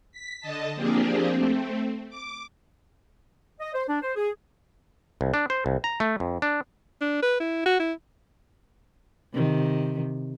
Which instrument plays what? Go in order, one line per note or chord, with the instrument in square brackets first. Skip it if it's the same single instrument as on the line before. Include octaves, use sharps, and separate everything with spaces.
[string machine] B6
D3 D#5 A5
F3 A#3 C4 D4 G4 G#4
A3 C4
D6
[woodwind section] D#5
C5
D4
C5
G#4
[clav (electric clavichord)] C2
D4
C5
C2
A#5
A3
F2
D4
[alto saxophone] D4
B4
E4
F#4
E4
[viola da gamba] C3 D#3